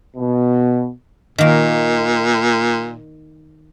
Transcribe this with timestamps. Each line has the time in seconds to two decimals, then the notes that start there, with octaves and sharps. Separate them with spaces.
0.17 B2
1.38 A#2 D#3 A#3